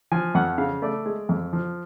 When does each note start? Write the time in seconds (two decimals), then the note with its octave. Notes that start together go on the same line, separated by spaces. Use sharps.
0.12 F3 G#5
0.35 F2 F#5
0.58 C#3 F5
0.82 A3 D5
1.06 G#3
1.29 F2
1.53 F3